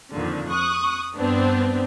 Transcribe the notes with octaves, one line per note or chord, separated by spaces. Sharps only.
F2 A#2 D3 D#3
C#6 D#6 F#6
G2 B3 C4 D4